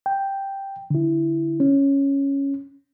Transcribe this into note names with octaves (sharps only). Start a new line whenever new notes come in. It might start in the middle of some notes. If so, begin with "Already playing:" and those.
G5
D3 E4
C#4